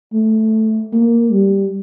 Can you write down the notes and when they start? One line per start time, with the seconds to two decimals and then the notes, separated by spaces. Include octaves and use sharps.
0.13 A3
0.93 A#3
1.31 G3